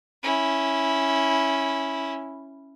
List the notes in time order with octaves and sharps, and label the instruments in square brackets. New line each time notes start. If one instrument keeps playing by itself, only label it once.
[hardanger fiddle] C#4 E4